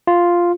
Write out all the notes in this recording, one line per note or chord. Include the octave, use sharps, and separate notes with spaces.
F4